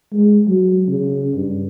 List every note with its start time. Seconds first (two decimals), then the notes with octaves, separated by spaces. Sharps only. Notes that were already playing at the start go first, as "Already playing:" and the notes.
0.12 G#3
0.48 F#3
0.88 C#3
1.35 G2